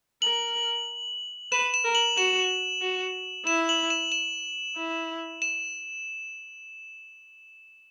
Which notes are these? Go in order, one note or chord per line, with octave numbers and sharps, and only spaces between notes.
A#4 F#7
B4 E7
E7
A#4
F#7
F#4 E7
F#4
E4 E7
F#7
E7
E7
E4
E7